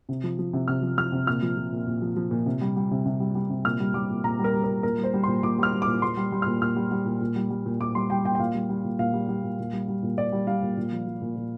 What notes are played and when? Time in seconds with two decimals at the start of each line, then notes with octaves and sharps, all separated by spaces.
0.09 C3
0.24 F3
0.39 F3
0.53 C3
0.68 C3 F6
0.82 F3
0.97 F3 F6
1.12 C3
1.27 A#2 F6
1.42 F3
1.57 F3
1.72 A#2
1.87 A#2
2.02 F3
2.16 F3
2.31 A#2
2.46 C3
2.61 G3
2.76 G3
2.91 C3
3.06 C3
3.20 G3
3.35 G3
3.50 C3
3.65 A#2 F6
3.80 G3
3.94 G3 D6
4.10 A#2
4.24 A#2 A#5
4.39 G3
4.44 A#4
4.54 G3
4.64 A#4
4.69 A#2
4.83 A#2 A#4
4.98 G3
5.04 C5
5.14 G3
5.23 A#2 C6
5.43 A#2 D6
5.58 G3 F6
5.73 G3
5.82 D6
5.87 A#2
6.02 A#2 C6
6.17 G3
6.32 G3
6.42 A#2 F6
6.62 A#2 F6
6.76 G3
6.91 G3
7.06 A#2
7.21 A#2
7.36 G3
7.50 G3
7.66 A#2
7.80 A#2 D6
7.95 G3 C6
8.10 G3 G5
8.24 A#2 G5
8.35 G5
8.39 A#2 F5
8.54 G3
8.69 G3
8.84 A#2
8.99 A#2 F5
9.14 G3
9.29 G3
9.43 A#2
9.59 A#2
9.73 G3
9.88 G3
10.03 A#2
10.17 A#2 D5
10.33 G3
10.47 G3 F5
10.62 A#2
10.77 A#2
10.92 F3
11.07 F3
11.22 A#2
11.36 A#2